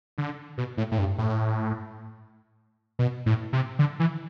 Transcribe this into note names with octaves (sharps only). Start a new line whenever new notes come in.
D3
B2
A2
A2
G2
A2
B2
A2
C3
D3
E3